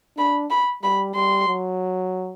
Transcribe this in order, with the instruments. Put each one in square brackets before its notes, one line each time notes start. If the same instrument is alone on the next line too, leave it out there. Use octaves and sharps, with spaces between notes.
[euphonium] D4 [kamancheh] B5
[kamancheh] B5
[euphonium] G3 [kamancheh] B5
[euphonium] G3 [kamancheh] C6
[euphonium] F#3